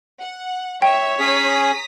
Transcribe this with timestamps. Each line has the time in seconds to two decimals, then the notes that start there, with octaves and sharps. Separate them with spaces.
0.21 F#5
0.82 C#5 E5 G5
1.20 C#4 G#4 A#5 D#6 B6